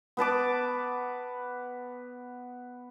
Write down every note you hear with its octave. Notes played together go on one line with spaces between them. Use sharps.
B3 B4 A5 D6